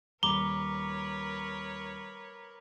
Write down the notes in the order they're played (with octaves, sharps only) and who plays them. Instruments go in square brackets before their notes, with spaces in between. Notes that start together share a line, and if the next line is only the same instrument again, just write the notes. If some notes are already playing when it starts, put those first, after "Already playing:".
[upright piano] D#1 B5 [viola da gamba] A#4 B4 C#5 [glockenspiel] A#5 D6 [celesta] G7